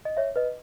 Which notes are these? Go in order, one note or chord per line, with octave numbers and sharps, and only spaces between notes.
D#5
C#5 E5
B4 D#5